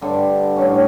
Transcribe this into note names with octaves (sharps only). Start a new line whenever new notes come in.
G2 D3 G3
A2 G3 C#4